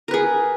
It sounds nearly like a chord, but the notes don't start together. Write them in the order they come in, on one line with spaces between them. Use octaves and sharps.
A#4 B4 G#4